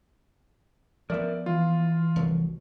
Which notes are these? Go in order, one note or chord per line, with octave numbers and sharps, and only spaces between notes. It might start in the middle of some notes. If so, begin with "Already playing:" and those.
F3 B3 A#4 D5 E5
E3 F4
F1 C2 F#3